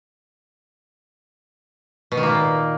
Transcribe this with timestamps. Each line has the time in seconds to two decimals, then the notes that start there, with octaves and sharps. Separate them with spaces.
2.12 B2
2.17 D#3
2.23 A#3
2.29 A#2